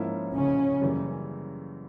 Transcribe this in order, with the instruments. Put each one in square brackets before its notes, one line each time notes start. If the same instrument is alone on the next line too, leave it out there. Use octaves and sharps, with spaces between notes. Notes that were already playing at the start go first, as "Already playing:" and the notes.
Already playing: [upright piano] G#2 F3 A#3 C#4 E4
[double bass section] C#3 C#4
[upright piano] F#2 C#3 E3 G3 A#3